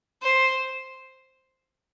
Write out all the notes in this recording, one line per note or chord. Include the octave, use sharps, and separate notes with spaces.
C5